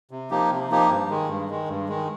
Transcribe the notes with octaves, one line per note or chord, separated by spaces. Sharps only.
C3
F3 A#3 D#4 G4
C3
F3 A#3 D#4 G4
G2
D#3 G#3
G2
D#3 G#3
G2
D#3 G#3